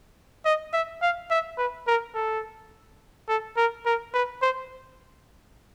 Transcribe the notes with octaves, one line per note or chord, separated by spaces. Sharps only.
D#5
E5
F5
E5
B4
A#4
A4
A4
A#4
A#4
B4
C5